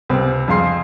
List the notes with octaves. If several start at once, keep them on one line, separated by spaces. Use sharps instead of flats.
C#2 C3 B3 C4
F2 G#4 F5 C6 C7